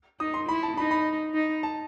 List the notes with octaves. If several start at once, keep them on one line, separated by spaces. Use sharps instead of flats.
D#4 D#6
C6
E4 B5
A5
D#4 B5
B5
D#4
A5